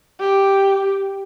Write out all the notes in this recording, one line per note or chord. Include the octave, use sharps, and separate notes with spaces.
G4